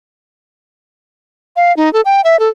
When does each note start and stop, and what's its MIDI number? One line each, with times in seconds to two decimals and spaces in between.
1.56 1.75 77
1.77 1.92 63
1.93 2.01 69
2.05 2.21 79
2.24 2.39 76
2.39 2.48 69